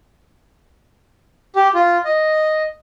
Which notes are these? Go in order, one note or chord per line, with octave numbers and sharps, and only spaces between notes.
G4
F4
D#5